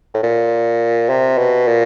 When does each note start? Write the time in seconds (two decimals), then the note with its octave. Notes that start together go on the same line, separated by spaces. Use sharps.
0.14 A2
0.23 A#2
1.09 C3
1.38 B2
1.68 A#2